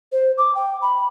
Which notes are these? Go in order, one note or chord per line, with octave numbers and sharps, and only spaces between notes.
C5
D6
G5
B5